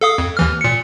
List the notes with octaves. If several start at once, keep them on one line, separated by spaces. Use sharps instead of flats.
A4 F5 D#6
F2
D#2 E3 F6
A#2 C#7